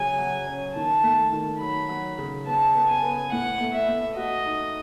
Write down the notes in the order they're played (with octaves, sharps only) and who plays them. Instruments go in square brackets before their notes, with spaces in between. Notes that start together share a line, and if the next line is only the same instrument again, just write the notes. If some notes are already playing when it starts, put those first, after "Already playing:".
Already playing: [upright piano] C#3 F#3 [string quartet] G#5
[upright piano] F#3
C#4
[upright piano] D#3 [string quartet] A5
[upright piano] A3
D#3
[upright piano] F#3 [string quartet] B5
[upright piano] F#3
C#3
[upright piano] B3 [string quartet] A5
[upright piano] B3
[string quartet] G#5
[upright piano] B3
[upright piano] A2 [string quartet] F#5
[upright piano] A3
[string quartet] E5
[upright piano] A3
[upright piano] F#4 [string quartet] D#5
[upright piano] D#4